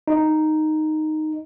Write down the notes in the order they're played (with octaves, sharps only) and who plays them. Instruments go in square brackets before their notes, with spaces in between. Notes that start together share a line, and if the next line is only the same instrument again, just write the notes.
[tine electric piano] D#4